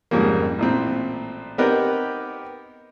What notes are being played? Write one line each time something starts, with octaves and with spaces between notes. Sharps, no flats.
F2 G#2 C#3 F3 G3 A#3
A1 A#2 C4
B3 C4 D#4 G4 A#4 B4